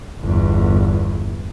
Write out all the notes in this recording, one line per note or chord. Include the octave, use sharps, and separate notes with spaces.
G1 E2